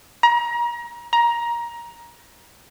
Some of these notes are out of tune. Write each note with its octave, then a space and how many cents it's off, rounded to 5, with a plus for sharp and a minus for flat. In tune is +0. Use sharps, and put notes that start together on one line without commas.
A#5 +30
A#5 +15